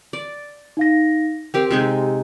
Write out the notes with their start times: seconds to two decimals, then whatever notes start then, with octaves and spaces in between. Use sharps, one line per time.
0.13 D5
0.77 D#4 F5 A#6
1.54 C4 G4 A#4 F5 G5
1.71 C3 G#3 D#4 G4